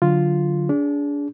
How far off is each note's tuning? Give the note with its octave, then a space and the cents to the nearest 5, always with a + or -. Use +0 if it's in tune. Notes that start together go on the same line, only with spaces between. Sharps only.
D3 +0 F#3 +0 F4 +0
D4 -30 G#4 +0